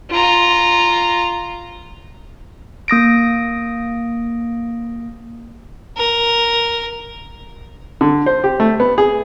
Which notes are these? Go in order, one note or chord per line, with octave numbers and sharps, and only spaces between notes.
F4 A#5
A#3 D#6 A#6 D7
A#4
D3
C5
G4
A3
B3
G#4